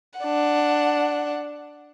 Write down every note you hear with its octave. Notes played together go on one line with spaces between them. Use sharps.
D4 F#5